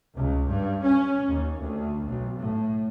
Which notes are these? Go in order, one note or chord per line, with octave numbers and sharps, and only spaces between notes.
C#2
G2
C#4
D#2
D2
B1
A2